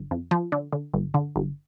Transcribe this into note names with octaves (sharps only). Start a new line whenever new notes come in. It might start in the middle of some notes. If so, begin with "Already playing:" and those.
Already playing: G1
F2
F3
D3
D3
G1
D3
G1